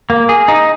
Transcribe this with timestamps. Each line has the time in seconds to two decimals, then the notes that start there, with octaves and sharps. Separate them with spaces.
0.10 A#3
0.29 G#4
0.48 D#4